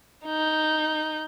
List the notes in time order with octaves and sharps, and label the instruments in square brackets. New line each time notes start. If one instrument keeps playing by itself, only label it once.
[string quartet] D#4 G6